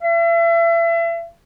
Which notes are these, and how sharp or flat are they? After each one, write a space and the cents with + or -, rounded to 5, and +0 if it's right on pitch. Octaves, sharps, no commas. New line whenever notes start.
E5 +35